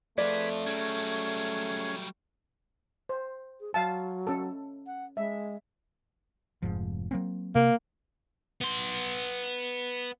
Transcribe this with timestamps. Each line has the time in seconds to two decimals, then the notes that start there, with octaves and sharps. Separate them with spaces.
0.18 F2 F3 A3 G#4 B4 D5
0.66 F#3 G3 C#4 G#4
3.09 C5
3.60 G#4
3.74 F#3 F5 A5
4.27 C#4 A4
4.87 F#5
5.17 G#3 E5
6.62 F1 G#2 F3
7.11 F#3 A#3 C4
7.55 C3 A#3
8.61 B3 C6